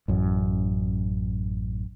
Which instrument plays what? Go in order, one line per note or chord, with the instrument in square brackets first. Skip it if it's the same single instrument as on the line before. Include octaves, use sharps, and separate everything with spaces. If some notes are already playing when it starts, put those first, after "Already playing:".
[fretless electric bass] A1 F#2